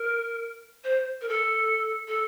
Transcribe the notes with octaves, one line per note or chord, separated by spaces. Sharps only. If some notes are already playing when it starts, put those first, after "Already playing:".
Already playing: A#4
C5
A#4
A4
A4